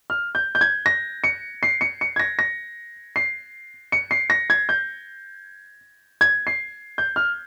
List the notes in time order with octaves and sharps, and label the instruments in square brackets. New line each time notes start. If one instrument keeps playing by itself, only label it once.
[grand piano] F6
G6
G6
G#6
A#6
C#7
C7
C#7
C#7
G#6
A#6
A#6
C7
C#7
C7
A#6
G#6
G6
G#6
C7
G6
F6